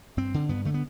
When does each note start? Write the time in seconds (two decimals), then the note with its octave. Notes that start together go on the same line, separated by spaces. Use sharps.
0.17 G2 C4
0.34 D3
0.49 G2 B3
0.65 D3 A3
0.74 B3